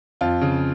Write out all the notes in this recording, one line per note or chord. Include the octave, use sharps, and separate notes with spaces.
F2 F4
C#3